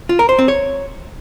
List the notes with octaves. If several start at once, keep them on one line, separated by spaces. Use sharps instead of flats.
F4
A#4
C5
C4
C#5